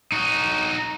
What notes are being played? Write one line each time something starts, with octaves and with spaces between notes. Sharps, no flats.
D#4 F#4